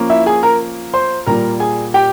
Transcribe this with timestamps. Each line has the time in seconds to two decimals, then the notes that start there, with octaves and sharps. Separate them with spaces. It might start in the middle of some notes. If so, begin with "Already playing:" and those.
Already playing: F3 A#3 C#4 F4
0.10 E4 E5
0.26 G#4 G#5
0.43 A#4 A#5
0.93 C5 C6
1.26 A#2 G3 A#3 F4 A#4 A#5
1.60 G#4 G#5
1.94 G4 G5